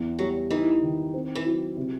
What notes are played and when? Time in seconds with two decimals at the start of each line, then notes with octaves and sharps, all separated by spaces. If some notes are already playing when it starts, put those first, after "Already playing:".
Already playing: E2
0.19 F#3 G3
0.50 E3 D#4
0.82 D#3
1.14 C4
1.35 E3
1.46 F#3
1.77 C3